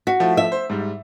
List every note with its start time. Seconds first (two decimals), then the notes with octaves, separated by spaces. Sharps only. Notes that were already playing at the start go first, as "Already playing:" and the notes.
0.07 F#4 B6
0.20 F3 A3 E4
0.37 E5
0.52 C5
0.70 G#2 G3